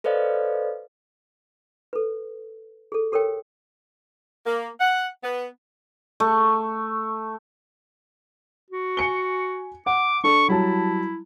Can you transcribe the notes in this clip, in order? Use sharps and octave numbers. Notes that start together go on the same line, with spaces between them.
A4 B4 C5 D5 D#5 F5
A4 B4
G#4 A4
G4 A4 A#4 C#5 G5
A#3
F#5
B3
A3
F#4
G#5 C#7 G7
F#5 D6
D4 A4 C#6
F#3 G3 E4 A5